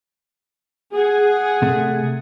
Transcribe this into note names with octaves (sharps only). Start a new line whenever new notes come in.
G#4 F#5
C3 A3